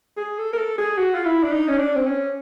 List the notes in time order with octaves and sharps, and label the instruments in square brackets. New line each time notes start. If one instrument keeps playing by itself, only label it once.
[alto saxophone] G#4
A4
A#4
A4
G#4
F#4
F4
E4
D4
D#4
C#4
D4
C4
C#4